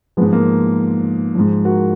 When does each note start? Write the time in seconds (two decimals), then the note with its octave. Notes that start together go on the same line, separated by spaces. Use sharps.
0.17 F3 G#3 B3
0.21 G#2
0.33 A#3
1.35 G#2 F3
1.65 F#4 A#4